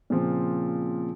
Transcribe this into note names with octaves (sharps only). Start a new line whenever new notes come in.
A#2 C#3 F3 C4